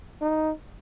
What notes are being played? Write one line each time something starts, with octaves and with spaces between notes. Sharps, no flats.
D#4